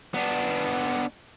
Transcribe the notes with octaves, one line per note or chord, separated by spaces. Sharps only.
B3 D4